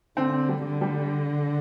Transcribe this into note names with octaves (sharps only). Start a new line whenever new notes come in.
D3 C4
G3
D3
G3